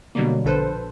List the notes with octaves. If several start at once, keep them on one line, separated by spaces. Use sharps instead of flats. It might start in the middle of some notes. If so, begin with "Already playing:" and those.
B2 D3 F#3 G3 A#3
A#1 D3 A4 B4 C5